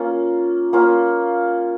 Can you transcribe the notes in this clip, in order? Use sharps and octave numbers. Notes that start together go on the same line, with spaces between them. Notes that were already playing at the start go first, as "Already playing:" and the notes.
Already playing: A#3 C#4 F4
A#3 C#4 F4